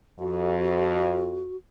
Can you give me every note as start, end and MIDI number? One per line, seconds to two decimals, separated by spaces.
0.20 1.50 41
0.20 1.57 66